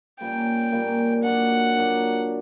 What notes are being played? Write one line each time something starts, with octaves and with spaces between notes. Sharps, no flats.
A#2 G3 A#3 C#4 G5
A#2 G3 A#3 C#4
A#2 F#3 A#3 D4 F#5
A#2 F#3 A#3 D4